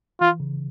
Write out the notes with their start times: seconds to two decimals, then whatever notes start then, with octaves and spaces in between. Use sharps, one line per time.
0.21 E3 F4
0.40 C#3